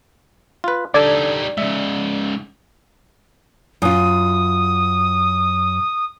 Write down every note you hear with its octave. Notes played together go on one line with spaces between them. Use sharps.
F4 B4
D3 G3 D#4 A4 D5 G#6
G#2 C#3 E5
F#2 F4 D#6